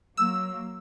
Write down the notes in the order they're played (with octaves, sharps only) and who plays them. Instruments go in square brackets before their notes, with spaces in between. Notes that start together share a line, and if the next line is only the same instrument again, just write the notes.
[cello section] F#3 A#3 [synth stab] E6